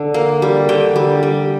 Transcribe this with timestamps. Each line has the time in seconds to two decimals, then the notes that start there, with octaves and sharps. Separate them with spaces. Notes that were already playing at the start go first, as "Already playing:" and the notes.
Already playing: D3
0.14 A#3
0.42 G3
0.69 D3 G5
0.96 G3
1.23 G3